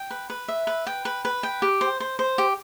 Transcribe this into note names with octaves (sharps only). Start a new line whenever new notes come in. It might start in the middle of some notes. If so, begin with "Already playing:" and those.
Already playing: G5
B4
B4
E5
B4
G5
B4
B4
G5
G4
C5
C5
C5
G4